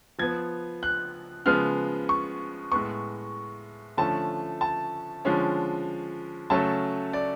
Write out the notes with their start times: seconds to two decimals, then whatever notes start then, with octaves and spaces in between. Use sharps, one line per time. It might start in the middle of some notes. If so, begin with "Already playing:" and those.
0.18 F3 B3 G#6
0.83 F#6
1.46 C#3 F3 G#3 B3 F6
2.09 C#6
2.72 A2 G#3 B3 C#6
3.97 D3 F3 A3 C#4 A5
4.61 A5
5.25 D3 F3 G#3 C#4
6.50 C#3 F#3 A3 C#4 A5
7.13 D5